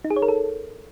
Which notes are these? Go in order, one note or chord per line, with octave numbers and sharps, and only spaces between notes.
D#4
G#4
C#5
A#4
A4